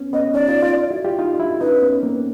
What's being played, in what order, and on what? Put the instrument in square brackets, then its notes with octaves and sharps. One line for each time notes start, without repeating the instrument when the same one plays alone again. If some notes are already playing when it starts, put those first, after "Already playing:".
Already playing: [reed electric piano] B3 C#4
[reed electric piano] B3 C#4 [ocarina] D#5
[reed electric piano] C#4 D#4 [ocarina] D5
[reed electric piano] D#4 F4
D#4 F4
E4 F#4
F4 G4
D#4 F4
D4 E4
[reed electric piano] C#4 D#4 [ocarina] B4
[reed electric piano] B3 C#4
A#3 C4